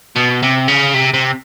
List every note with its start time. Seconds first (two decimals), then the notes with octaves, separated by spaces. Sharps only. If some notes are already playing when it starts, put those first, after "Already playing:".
0.16 B2
0.43 C3
0.68 C#3
0.94 C3
1.14 C3